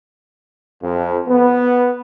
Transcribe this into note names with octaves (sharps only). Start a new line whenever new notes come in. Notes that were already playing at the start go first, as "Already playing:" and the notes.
F2
B3